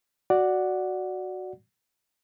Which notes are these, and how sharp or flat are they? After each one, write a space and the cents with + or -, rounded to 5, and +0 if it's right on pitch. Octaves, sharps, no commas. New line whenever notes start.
F#4 +0 D5 +0 F#5 +0